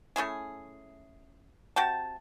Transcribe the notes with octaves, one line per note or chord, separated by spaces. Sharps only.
A3 C#4 E4 G#4
C3 F#4 G5 A5